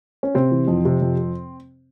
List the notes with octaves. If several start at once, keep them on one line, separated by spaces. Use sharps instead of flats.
C#4
C3 C4
E3
F2
C3
F2